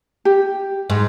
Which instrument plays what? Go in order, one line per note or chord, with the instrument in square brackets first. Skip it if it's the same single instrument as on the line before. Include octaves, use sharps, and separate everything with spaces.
[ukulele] G4
[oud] G#2